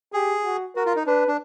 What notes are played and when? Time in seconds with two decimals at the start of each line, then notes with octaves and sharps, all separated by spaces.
0.13 G4 G#4
0.44 F#4
0.76 F#4 A#4
0.86 F4
0.96 D#4
1.06 D4 B4
1.28 D4